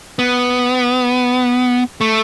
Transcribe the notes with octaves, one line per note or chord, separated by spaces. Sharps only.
B3
A3